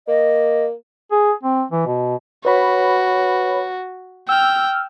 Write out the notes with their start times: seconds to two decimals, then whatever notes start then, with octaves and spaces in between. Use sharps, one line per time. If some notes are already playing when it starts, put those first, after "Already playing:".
0.08 A#3 D#5
1.12 G#4
1.43 C4
1.72 E3
1.87 B2
2.45 F#4 B4 C#5 B5
4.29 G5 E6 F6